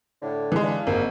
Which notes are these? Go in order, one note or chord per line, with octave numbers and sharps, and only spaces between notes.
A2 D3
E3 G#3
D4 F5
G#1 G#2 A#3